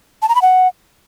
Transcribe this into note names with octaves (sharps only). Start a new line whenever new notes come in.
A5
A#5
B5
F#5